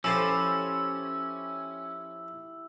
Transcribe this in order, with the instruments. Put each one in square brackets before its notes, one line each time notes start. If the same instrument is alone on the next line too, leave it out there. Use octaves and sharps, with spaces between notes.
[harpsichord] F3 A4 C5 [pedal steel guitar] C#4 [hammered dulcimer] E4 G4 [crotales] E6